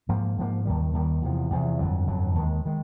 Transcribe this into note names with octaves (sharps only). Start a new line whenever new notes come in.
G#2 F3 A#3
G#2 F3 A#3
D#2 D#3 G3
D#2 D#3 G3
E2 C3 F3
E2 C3 F3
G1 F2 D3 F#3
G1 F2 D3 F#3
D#2 D#3 G#3
D#3 G#3